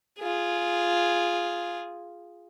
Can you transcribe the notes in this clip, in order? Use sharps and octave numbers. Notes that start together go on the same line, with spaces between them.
F4 G#4